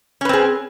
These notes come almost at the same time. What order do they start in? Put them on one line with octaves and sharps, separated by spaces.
C#4 B4 C4 G#4